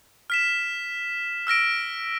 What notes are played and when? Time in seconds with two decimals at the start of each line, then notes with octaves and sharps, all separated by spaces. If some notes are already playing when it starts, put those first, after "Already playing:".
0.30 F6 B6 E7
1.47 E6 F6 A#6 D7